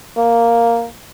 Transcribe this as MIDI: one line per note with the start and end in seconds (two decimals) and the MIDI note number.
0.17 0.88 58